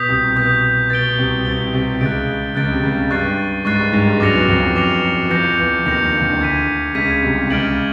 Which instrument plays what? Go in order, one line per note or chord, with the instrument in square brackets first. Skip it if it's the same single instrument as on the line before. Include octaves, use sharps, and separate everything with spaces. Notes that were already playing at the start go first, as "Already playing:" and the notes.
Already playing: [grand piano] B2 [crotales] D#6 G6 B6
[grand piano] C2 C3
[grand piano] B2 [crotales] D#6 G6 B6
[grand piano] B2 [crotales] A6 D7 G7
[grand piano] B2
C2 C3
[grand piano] C2 C3 [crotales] A6 D7 G7
[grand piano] C2 C3
[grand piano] C#2 C#3 [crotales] F#6 A6 D7
[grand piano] C#2 C#3 [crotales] F#6 A6 D7
[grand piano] C3
C#2 C#3
[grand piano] G2 G3 [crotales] C#6 F#6 A6 C7
[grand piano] G#2 G#3 [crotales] C#6 F#6 A6 C7
[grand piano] G2 G3
G#2 G#3
G2 G3
[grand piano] F#2 F#3 [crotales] D6 F6 A#6 C#7 F7
[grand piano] E2 E3
F2 F3
F#2 F#3
[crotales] D6 F6 A#6 C#7 F7
[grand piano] F#2 F#3
E3
[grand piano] F2 F3 [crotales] G6 A#6 C#7 F7
[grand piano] F3
E2 E3
[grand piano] D#2 D#3 [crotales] G6 A#6 C#7 F7
[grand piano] D3
D#3
D2 D3
[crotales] G#6 B6 D#7
[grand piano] C#2 C#3 [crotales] G#6 B6 D#7
[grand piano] C2 C3
[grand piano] C#2 C#3 [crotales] F6 A6 D7 F#7